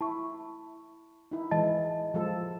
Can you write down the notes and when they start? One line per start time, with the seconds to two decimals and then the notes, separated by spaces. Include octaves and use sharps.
0.01 E4 A5 C#6
1.32 D#4 E4
1.51 E3 G#3 D#5 A5 A6
2.14 F3 G#3 A4